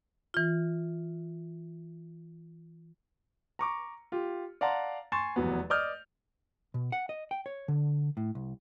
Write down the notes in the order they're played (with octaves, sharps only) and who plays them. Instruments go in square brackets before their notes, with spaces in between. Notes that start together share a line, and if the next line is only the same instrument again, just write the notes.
[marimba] E3 F4
[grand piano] A#5 C#6 D6
F4 G4
D5 F5 F#5 A5 A#5 C6
G#5 C6 C#6 A6 E7
F1 E2 F#3 B3
D5 D#5 D6 D#6 F6 G6
[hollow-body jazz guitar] B2
F#5
D#5
G5
C#5
D3
A2
C2